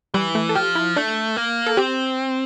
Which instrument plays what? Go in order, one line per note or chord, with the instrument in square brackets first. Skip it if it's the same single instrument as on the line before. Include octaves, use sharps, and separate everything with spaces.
[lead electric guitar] E3 [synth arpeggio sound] G3
[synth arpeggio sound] A3
A4
[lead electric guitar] F3 [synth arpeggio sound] G4
[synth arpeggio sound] E4
[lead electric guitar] A3 [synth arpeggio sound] D4
[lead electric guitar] A#3
[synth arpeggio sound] A4
[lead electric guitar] C4 [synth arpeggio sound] G4